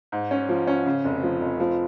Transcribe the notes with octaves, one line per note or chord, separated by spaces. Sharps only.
G#2
C#4
F3
C#4
C#3
F1
F3
F1
F3